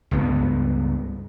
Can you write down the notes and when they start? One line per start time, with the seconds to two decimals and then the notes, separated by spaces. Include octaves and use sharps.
0.11 C#2 G2 B3